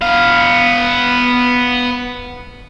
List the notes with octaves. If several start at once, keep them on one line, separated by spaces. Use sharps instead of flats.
B3 F5